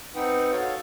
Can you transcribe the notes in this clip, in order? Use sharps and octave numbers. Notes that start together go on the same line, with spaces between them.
C4 D#4 B4 F#5 G5
F#4 A4 C#5 F5